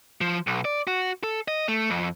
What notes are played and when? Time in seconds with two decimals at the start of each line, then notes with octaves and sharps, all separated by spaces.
0.21 F3
0.47 B1
0.65 D5
0.87 F#4
1.23 A4
1.48 D#5
1.68 A3
1.90 F2